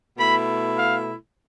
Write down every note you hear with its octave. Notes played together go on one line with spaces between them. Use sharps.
B2 A3 E4 B5
F5